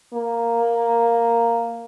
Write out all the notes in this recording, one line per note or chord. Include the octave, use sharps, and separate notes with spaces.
A#3